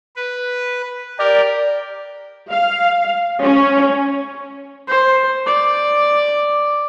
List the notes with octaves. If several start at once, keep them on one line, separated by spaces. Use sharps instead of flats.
B4
G4 A#4 D5
F5
C#4
C5
D5